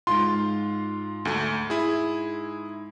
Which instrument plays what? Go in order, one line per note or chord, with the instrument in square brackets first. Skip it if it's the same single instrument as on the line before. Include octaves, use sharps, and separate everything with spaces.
[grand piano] G#2 C6 [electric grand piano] F4
[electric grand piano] D2 A3
E4 G#4